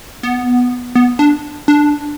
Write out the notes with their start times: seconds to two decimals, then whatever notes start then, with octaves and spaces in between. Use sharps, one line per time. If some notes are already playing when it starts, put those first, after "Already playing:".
0.23 B3
0.95 B3
1.19 D4
1.68 D4